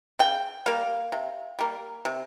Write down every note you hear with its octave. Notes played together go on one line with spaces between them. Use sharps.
C#3 G5
G3 A#3 F5
C3
G3 A#3
C3